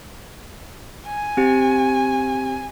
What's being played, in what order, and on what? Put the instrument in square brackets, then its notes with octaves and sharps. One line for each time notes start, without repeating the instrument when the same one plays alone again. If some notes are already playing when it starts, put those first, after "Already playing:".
[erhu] G#5
[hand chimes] C4 G4